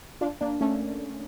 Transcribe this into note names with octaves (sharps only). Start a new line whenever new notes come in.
D4 F4
A#3 D4
A3 C#4